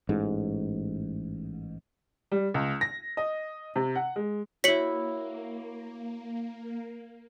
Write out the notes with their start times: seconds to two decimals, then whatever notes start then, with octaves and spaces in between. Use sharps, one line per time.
0.09 A1 G#2
2.32 G3
2.54 C#2
2.81 A#6
3.17 D#5
3.76 C3
3.96 F#5
4.16 G#3
4.64 A#3 E4 F#4 C#5 B6 C#7 F#7